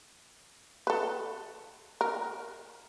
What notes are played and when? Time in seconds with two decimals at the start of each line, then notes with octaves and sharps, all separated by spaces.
0.87 A4 B4
2.01 A#4